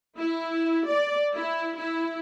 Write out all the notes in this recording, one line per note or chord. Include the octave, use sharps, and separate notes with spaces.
E4
D5
E4
E4